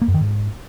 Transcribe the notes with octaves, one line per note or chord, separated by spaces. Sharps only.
A#3
F#2
D#3
G#2